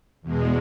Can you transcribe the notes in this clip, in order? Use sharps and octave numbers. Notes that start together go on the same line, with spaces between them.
E2 B2 G#3